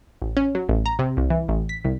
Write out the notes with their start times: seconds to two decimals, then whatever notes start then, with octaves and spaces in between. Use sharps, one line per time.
0.22 A1
0.37 C#4
0.55 F#3
0.69 A1
0.86 A#5
0.99 C3
1.17 C2
1.30 E3
1.48 A1
1.69 B6
1.85 C2